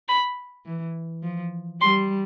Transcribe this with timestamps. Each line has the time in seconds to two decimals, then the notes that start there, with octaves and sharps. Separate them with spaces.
0.09 B5
0.66 E3
1.23 F3
1.81 G3 C6